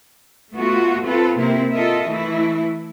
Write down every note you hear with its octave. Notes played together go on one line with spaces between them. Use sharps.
A3 B3 F4 F#4
C4 F4 A4 B4
C3 A#3 C4 E4 A#4
F4 A4 A#4 D#5 E5
E3 A3 E4